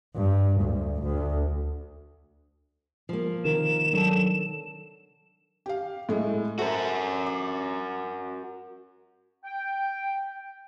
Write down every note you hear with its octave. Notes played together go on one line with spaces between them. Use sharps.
G2
D2
D2
F3 A#3
C3 D#3 A#4 E7
F#3 D4 A4 A5
G4 F5
A2 G#3 A3
F#4 A4 A#4 C5 E5
D6
G5